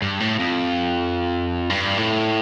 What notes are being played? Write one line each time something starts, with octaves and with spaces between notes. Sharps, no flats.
G2
A2
F2
G2
A2